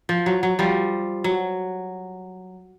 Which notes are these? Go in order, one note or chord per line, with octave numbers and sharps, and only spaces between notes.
F3
F#3
F#3
F3 G3
F#3